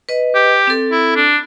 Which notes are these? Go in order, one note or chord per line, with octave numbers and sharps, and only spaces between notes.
B4 D#5
G4
C4 A4
E4
D4